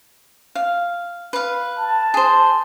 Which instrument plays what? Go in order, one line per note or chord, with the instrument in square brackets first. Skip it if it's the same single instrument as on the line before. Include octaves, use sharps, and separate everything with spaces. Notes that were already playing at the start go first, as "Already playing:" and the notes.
[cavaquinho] F5
B4 F5
[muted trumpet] A5
[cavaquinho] G#4 C5